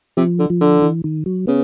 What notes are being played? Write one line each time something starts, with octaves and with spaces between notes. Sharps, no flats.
C3 F3
D3
F3
D3
E3
D#3
F#3
C#3 B3